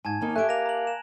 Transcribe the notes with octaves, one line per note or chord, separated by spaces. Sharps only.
G#2 G#5 A5 G#6
D#2 A#3 D#4
A3 G4 E5 G#5 F#6 D7
A#3 A#6 D#7 F7
A#5 F#7
E7